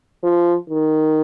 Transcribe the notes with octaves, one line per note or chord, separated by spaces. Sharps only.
F3
D#3